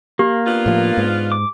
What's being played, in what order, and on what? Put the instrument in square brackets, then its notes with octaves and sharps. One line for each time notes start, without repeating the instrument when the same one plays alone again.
[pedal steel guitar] A#3 [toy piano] G4
[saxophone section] B3 D4 F4
[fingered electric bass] A2 F3
G#2
[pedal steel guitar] D6